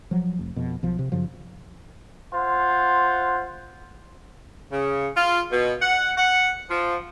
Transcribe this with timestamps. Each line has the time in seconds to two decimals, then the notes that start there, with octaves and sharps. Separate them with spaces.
0.11 F3 F#3
0.39 F1
0.56 F2 B2
0.83 B1 F3
0.99 C3
1.12 F#2 C#3 F3
2.34 F4 C5 F#5
4.72 C#3
5.17 F4
5.52 B2
5.82 F#5
6.17 F#5
6.70 F3